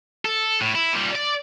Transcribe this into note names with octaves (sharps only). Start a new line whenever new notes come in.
A4
A2
E4
A#2 G3
D5